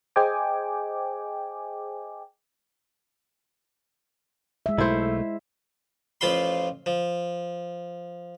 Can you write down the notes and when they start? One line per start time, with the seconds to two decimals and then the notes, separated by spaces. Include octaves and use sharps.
0.16 G#4 C5 D#5 G5 G#5 D6
4.66 G#3 E5
4.78 B1 A3 E4 C5
6.21 A1 F3 F4 F5 B5 C6
6.86 F3